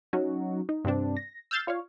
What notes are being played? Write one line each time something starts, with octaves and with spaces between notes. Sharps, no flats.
F#3 C#4 D#4 F#4
D#4
G2 C3 C4 D4
A#6
E6 F6 G6 A6 C7
F4 C#5 D5 F5